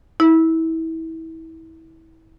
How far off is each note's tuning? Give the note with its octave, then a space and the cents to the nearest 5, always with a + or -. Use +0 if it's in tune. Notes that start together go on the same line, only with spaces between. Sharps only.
E4 -30